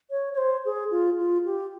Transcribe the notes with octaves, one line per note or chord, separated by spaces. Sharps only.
C#5
C#5
C5
G#4
F4
F4
G4